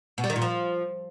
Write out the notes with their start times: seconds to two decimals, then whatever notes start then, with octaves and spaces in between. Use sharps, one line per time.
0.18 B2
0.24 G3
0.30 D#3
0.36 A#2
0.42 F3